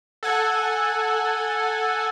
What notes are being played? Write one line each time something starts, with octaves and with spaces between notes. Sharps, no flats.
A4 F#5 G#5